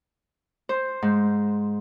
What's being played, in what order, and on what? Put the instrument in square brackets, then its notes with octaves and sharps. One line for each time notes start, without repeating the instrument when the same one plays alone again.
[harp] C5
G#2